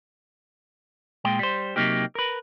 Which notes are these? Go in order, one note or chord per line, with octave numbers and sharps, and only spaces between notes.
A#2 G#3 G5
G3 C5
C3 F#3 A#3 D#4 G4
A#4 B4